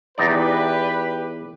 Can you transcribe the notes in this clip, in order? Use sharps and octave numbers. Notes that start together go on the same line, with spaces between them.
E2 D#4 G4 B4 D5